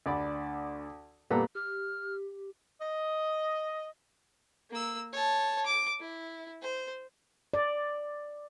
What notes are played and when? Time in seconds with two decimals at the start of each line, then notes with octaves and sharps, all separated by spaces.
0.06 D2 D5 B5
1.30 A#2 G3 B3 A4 B4 A#5
1.55 G4 F6
2.81 D#5
4.70 A#3 E6
5.13 C#5 A5
5.66 D6
6.00 E4
6.62 C5
7.54 D5